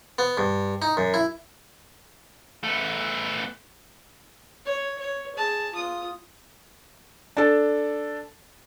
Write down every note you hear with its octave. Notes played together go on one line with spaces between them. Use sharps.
B3
G2
D#4
F#2
E4
A3 B3
C#5
C#5
G#4 A5
F4 D#6
D4 A4